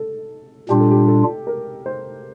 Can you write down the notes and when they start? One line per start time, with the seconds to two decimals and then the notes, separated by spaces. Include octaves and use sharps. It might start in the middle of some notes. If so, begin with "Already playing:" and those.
Already playing: A4
0.69 A#2 G3 D4 F4 G4
0.80 A4
0.91 G4
1.08 A4
1.47 A#4
1.86 C5